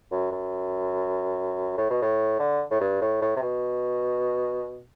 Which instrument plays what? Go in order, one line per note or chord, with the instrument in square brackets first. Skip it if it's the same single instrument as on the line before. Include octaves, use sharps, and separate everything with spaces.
[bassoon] F#2
F#2
A2
B2
A2
D3
A2
G2
A2
A2
C3
B2